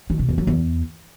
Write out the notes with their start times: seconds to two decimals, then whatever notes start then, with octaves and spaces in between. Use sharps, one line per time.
0.10 D#3
0.19 B2
0.29 E2
0.38 F#3
0.47 E2